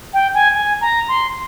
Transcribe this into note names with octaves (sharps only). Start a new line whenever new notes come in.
G5
G#5
G#5
A#5
C6